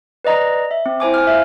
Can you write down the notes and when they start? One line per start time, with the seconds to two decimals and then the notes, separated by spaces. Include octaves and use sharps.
0.25 B4 D5 D#5 A#5
0.71 E5
0.86 C4
1.00 E4 C5 G#5 D6
1.14 G#5 F6
1.27 E5 F5